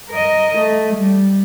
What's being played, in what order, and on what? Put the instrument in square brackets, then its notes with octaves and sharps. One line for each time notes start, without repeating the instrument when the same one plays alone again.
[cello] A#4 D#5
A3
G3